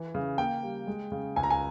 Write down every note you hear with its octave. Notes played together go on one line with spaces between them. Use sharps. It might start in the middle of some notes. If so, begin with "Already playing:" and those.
Already playing: E3
C#3
A#3 G5
G3
G#3
C#3
C#2 G#5
A#5
G#5